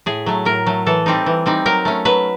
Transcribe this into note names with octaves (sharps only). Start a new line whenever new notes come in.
A2 G#4
F#3 A3
A2 A#4
F#3 A3
E3 A4
G3 C4 D#4
E3
G3 C4 D#4
F#3 A#4
A3 C#4
F#3 B4